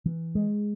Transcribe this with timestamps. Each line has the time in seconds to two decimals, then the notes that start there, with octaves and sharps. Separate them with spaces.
0.06 E3
0.35 G#3